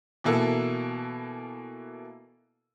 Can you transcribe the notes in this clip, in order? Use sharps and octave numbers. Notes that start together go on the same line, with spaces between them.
B2 E3 A#3 A4